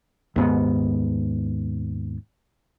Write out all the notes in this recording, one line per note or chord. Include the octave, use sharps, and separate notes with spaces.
D#2 G#2 B3